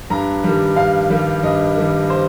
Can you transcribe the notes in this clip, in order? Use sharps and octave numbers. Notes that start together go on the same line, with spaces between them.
G2 A#5
D#3 G3
G2 F5
D#3 G3
G2 D#5
D#3 G3
C5